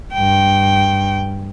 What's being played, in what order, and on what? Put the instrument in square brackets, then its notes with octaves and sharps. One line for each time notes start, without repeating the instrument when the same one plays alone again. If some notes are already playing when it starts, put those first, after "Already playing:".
[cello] G2 G5